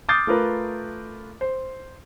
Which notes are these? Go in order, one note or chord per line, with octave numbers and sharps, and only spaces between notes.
D6 D#6 F6 G6 A6 C7
A3 F4 A#4 B4
C5